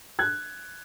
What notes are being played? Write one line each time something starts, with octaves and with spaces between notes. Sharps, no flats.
F#6 G#6